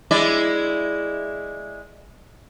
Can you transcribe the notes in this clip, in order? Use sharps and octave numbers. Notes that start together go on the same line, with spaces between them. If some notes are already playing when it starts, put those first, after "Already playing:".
G#3 E4 D5